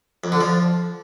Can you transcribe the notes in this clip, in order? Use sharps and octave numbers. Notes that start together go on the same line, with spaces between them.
F2
D3
F3